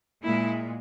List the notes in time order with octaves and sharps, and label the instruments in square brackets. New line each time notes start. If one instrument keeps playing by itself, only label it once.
[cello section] A#2 G#3 E4